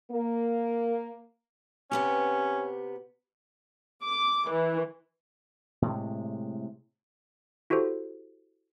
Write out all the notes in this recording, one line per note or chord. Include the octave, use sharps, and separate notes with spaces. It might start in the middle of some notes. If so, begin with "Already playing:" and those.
A#3
C3 B3 C#4 G4
D6
E3
A2 C3 G#3
E4 F#4 G4 A4 C5